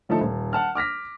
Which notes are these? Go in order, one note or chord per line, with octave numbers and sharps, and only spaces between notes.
D3 F3 A3 D#4 A4
D#1
F#5 A5 F6
D6 F6 A#6 B6